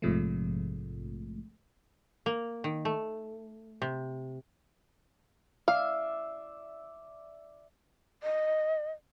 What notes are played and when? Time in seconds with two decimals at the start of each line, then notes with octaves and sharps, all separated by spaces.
0.02 A#1 G#2 C3 F3 G#3 A3
2.26 A#3
2.64 D#3
2.85 A3
3.82 C3
5.68 D5 E5 F5
8.23 D#5